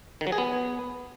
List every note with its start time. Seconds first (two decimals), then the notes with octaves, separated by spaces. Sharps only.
0.21 D#3
0.27 F#3
0.32 G#4
0.38 B3